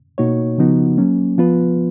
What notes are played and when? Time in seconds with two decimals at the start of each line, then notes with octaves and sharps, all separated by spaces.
0.18 B2 A#3 D#4 F#4 C#5
0.58 C#3 F3 B3 D#4 F#4
0.98 F#3 A#3 C#4
1.38 F3 B3 F4 B4